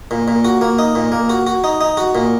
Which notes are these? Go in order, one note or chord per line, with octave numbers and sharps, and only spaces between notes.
A#2
A#2
F#4
A#3
D#4
A#2
A#3
F#4
F#4
D#4
D#4
F#4
A#2